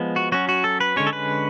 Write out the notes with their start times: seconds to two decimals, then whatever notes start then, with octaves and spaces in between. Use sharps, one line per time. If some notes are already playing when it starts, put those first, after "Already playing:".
Already playing: F3 G#3 B3
0.16 F#4
0.32 F#3 C#4 F#4
0.49 F#4
0.64 A4
0.81 B4
0.96 D3 G#3 C#4 C#5
1.07 A4
1.13 B4